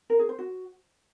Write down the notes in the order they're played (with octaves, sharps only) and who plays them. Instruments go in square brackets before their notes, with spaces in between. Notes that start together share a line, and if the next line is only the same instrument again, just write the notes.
[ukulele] A#4
G#4
C5
F#4